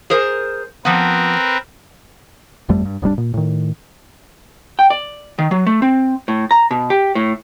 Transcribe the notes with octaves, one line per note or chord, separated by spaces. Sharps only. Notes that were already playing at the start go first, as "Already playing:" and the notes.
G#4 A#4 C5
F3 B3 C4 A#4 B4
G1 F2 G3 A3
G2
D#1 G#1 G3 D4
A#2
A2 D#3
G5
D5
D#3
F#3
A3
C4
A2
A#5
B2
G4
A2